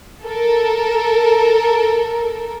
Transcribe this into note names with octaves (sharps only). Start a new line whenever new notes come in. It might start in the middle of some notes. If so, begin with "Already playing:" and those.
A4 A#4